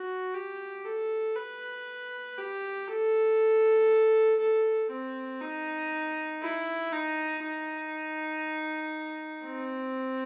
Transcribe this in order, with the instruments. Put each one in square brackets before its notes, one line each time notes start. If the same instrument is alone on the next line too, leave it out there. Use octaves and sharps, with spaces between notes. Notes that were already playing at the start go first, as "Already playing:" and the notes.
Already playing: [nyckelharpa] F#4
G4
A4
B4
G4
A4
A4
C4
D#4
E4
D#4
D#4
C4